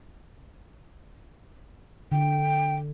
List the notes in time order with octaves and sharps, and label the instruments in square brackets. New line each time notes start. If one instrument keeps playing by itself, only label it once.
[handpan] D3 [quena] G5